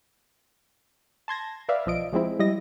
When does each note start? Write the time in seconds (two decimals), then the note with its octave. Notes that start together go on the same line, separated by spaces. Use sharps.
1.28 A5 C6 G#6 A#6
1.69 B4 D5 E5 F5
1.86 B1 F3 D#5 D7
2.13 F3 G#3 C4 E4
2.39 G3 E4 D#5 A#6